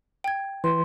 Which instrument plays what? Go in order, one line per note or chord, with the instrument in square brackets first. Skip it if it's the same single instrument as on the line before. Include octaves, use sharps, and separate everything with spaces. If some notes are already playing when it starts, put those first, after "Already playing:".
[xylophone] G5 G#6
[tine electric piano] E3 [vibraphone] C6